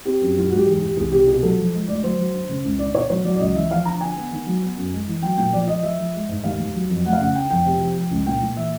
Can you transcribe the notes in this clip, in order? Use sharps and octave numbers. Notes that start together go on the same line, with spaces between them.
C4 G4
F#2
F#3 F4
G#2 F#4
G4
E2 G#4
E3 G4
C2 G#4
C3 G4
B2 G#4
F#3 A4
F3
G#3
D2 D5
F#3 C5
F#3
D3
C#3
C#2
D3 D5
B3 C#5
F#3 C#5
F#3 D5
D5
C#2 D#5
E3 E5
F3 F5
D3 A#5
D4 G#5
B3
D#3
F#3
B3
F#2
G#3
E3
F#3 G5
A#2 G5
F3 D5
F3 D#5
F3 E5
F3
G#3
G#2
D#2 F5
D#2
F#3
F2
A3 F#5
F5
C#3 F#5
D3 G5
F2 G5
C3
F3
F3
C#2
A#2 G5
A#2
E3 E5